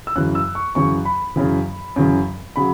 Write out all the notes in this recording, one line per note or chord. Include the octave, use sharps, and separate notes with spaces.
E6
F#2 C#3 E3 F#6
E6
C#6
F#2 C#3 E3 C#6
B5
F#2 C#3 E3
F#2 C#3 E3
C#3 F#3 B5